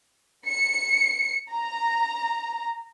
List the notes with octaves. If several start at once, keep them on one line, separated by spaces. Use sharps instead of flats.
C#7
A#5